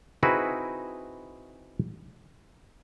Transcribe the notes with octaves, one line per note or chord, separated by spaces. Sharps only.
C4 D#4 E4 F#4 G#4 B4